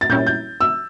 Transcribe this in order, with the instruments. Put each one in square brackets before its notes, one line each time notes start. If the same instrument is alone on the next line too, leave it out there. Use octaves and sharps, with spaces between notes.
[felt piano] A6
[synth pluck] A#2 G3 C#4 E4 [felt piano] G6
[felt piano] G6
E6